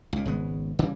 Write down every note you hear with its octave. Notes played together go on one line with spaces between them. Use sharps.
C#2 A#2
G#1 C#3 G#3 B3
C#3 E3 G3